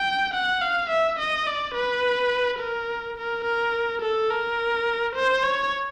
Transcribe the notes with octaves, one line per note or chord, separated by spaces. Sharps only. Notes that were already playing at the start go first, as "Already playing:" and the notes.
Already playing: G5
F#5
F5
E5
D#5
D5
B4
A#4
A#4
A#4
A4
A#4
C5
C#5